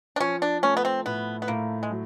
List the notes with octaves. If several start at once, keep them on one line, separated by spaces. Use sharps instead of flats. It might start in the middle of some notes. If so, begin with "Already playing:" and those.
D4
F3 C#4
D4
A3 C#4
B3
C4
A2 B3
B3
A2 A#3
G#3
F#3